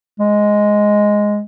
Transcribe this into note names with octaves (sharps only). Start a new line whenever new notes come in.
G#3